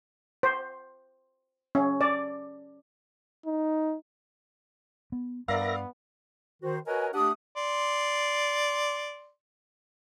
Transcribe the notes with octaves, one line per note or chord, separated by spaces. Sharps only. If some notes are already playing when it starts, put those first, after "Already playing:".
C5
C#4
D5
D#4
B3
G2 B3 A#4 D5 E5 F5 A#6
D#3 F#4 C5
F#4 A#4 B4 C#5 D#5 G#5
A3 D4 G4 F#5 D#6
D5 C6